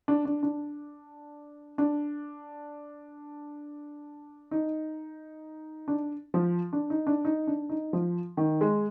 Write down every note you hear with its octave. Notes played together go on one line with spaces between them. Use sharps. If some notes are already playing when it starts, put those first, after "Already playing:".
D4
D4
D4
D4
D#4
D4
F3
D4
D#4
D4
D#4
D4
D#4
F3
D#3
G#3